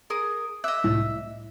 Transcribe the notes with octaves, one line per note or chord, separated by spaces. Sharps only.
G#4 A#4 D#6
D#5 E5 D6 F#6
C2 A2